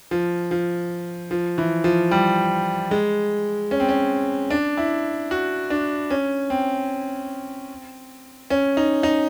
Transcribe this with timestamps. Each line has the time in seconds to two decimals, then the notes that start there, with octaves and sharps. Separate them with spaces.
0.11 F3
0.51 F3
1.31 F3
1.58 E3
1.84 F3
2.11 G3
2.91 G#3
3.71 C#4
3.80 C4
3.89 C#4
4.51 D4
4.77 E4
5.31 F#4
5.70 D4
6.10 C#4
6.50 C4
8.50 C#4
8.77 D#4
9.03 D#4